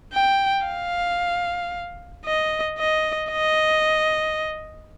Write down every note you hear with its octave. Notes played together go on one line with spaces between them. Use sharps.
G5
F5
D#5
D#5
D#5